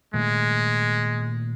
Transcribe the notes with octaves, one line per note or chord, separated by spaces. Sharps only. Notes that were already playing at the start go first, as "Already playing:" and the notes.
A#2 D#3 G#3 A3